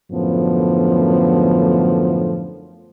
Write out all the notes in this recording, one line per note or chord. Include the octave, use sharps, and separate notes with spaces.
F#2 A2 D3 F3 B3